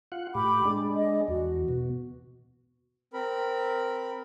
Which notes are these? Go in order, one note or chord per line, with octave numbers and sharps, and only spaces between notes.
F4 F#5
A2 G4 B5 D6
G#3 D4
D#5
E2 F#4
B2
C4 A#4 B5